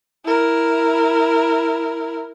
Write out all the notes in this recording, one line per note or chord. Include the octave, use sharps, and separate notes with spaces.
E4 A#4